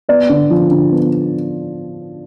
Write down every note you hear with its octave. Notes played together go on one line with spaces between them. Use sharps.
B3 D5
D3
F3
D3
B3